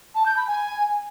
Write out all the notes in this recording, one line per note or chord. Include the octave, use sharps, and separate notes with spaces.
A5
G6
B5
G#5